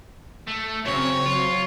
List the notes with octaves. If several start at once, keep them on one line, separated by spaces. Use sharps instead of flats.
A3
F#2 C#3 C4 C#5
F#3 F4